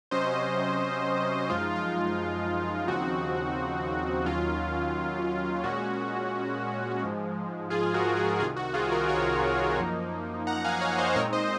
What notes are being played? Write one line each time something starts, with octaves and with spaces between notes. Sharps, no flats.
C3 F#3 C#4 C5 D#5
F#2 F3 G#3 D#4 F4
F4
D#2 C#3 F3 C4 D#4 F#4
D#2 D#3 F#3 C#4 F4
A#2 G#3 C#4 F#4
G#2 F3 G#3
F4 G#4
F#4 A#4
F4 G#4
C2 C3 D#3 F4 G#4
F#4
F4 G#4
F#4 A#4
A#4 C#5
F#2 F3 A#3 D#4
F#5 A#5
F5 G#5
C#5 F5
C5 D#5
A#2 G#3 C4 D#4 A#4 C#5
C5 D#5